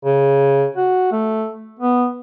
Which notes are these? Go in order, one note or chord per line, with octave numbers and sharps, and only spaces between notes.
C#3
F#4
A3
B3